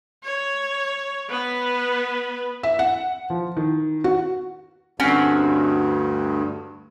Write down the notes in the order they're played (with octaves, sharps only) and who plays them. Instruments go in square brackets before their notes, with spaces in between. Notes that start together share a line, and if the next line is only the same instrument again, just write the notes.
[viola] C#5
B3 B4
[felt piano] E5
F#5
F3
D#3
F#4
[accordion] D2 G2 [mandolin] C4 C#4 F#4